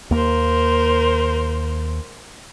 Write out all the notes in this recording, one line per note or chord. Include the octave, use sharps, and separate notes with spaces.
D#2 A#3 A#4 C5